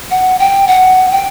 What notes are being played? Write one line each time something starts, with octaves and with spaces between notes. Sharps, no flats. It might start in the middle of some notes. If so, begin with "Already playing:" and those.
F#5
G5
F#5
G5